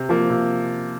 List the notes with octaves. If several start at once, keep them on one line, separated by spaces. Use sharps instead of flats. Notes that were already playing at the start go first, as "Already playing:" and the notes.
Already playing: C3
F3 A#3
C3